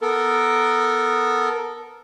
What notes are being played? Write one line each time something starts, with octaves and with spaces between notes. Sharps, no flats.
B3 A4 A#4